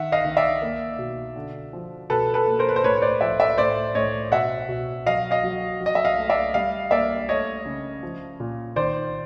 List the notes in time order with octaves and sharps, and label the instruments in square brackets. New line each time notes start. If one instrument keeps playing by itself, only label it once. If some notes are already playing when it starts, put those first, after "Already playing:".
Already playing: [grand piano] D#3 E5 F#5
D#5 F5
D#3
D5 E5
A#3
B2
D3
F3
B2 A4 B4
A4 B4
A#3
A#4 C5
B4
C5
A2 B4 C#5
C#5
C5 D5
F3 D5 E5
D5 E5
A2 C5 D5
A2 C#5 D#5
B2 E5 F#5
B2
F#3 D#5 F5
D#5 F5
F#3
F#3
D#5
E5
D#5 F5
A3
D5 E5
G3 D#5 F5
A#3 D5 E5
A3 C#5 D#5
C#3
F3
A#2
D#3 C5 D5